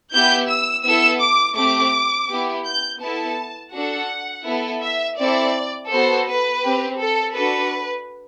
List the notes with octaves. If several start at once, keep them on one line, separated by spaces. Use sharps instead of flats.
B3 E4 G4 G6
E6
B3 E4 A4 E6
D6
A3 C4 G4 D6
B3 E4 G4
G6
B3 E4 A4 A5
D4 F#4 A4 F#5
B3 E4 A4
E5
C4 E4 A4 D5
B3 F#4 A4 C5
B4
C4 G4
A4
D4 F#4 A4 B4